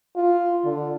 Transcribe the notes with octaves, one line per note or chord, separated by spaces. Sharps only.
F4
D3